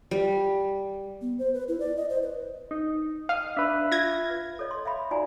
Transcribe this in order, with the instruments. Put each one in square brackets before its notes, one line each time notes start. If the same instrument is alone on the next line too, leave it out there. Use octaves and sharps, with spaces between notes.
[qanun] G3
[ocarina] B3
C5
B4
E4
D5
D#5
C5
B4
[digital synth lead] D#4
[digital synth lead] D#5 [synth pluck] F5
[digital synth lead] D4 [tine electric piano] B4 E5
[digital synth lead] F4 [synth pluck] G#6 A#6
[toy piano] A4 C#5 D#5
C6
E5 F5 B5
D#4 F4 F#4 D5 G#5 A#5